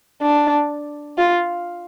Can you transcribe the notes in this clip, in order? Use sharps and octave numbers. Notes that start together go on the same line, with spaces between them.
D4
F4